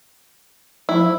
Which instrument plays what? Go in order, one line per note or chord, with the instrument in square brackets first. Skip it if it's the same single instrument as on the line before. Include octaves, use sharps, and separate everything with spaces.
[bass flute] F3 [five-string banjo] E4